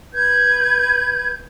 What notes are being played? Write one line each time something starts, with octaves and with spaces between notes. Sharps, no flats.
B4 G6 G#6